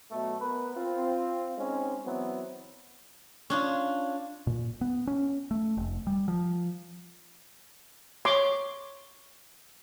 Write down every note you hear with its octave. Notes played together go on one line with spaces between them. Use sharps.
B2 F#3 A3
B3 A#4 B4
C4 F4
G#3 C4 C#4 D#4
E3 F#3 B3 C4
C#4 D4 F4
A#2
B3
C#4
A3
F1
G3
F3
C#5 C6 D6